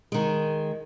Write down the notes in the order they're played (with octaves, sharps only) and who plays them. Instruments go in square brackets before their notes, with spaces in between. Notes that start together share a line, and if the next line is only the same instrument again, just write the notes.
[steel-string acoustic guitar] D#3 G#3